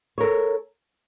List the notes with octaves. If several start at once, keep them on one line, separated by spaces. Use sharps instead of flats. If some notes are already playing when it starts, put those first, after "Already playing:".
A4 A#4 C#5